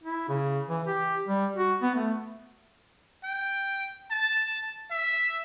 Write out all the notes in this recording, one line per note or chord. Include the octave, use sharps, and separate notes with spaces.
E4
C#3
E3
G4
G3
F#4
B3
A3
G5
A5
E5